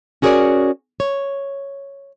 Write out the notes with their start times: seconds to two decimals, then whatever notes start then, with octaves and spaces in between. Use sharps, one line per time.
0.22 C#4 F#4 G#4 A#4 C#5 D5
1.00 C#5